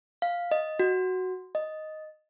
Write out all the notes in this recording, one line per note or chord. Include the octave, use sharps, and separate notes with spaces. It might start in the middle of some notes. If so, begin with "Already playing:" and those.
F5
D#5
F#4
D#5